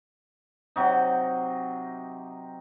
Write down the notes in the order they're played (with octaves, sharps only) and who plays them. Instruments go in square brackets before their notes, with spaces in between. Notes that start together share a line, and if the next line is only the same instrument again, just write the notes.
[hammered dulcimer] C3 F#3 D#4